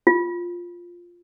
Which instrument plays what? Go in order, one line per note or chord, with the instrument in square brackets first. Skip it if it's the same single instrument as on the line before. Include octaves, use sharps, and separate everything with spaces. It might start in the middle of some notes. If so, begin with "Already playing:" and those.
[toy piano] F4